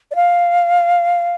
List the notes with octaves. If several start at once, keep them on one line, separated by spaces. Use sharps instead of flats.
D5
F5